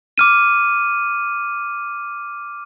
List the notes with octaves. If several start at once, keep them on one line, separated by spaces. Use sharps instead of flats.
D6 F6 D#7